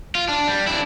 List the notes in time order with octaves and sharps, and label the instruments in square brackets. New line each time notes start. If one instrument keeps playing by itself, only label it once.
[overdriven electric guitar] F4
D4
G3
D4 E4